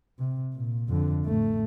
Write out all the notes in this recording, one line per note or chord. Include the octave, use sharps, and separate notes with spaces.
C3
A#2
F2 D3
A1 A3